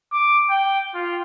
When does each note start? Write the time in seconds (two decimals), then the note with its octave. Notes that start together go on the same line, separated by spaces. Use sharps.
0.12 D6
0.50 G5
0.94 F4